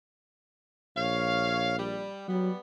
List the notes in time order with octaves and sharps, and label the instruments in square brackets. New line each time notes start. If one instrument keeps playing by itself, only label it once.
[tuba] A#1 [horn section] C#5 F5
[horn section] G3
[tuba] F#3 [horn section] G3 B3